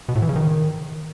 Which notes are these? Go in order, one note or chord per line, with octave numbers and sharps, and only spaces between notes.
B2
A2
E3
C#3
D#3